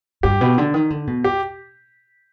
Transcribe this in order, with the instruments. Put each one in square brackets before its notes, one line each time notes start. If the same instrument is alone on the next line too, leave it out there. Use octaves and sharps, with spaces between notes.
[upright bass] G2 [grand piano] G4
[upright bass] B2
D3
D#3
D3
B2
[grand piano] G4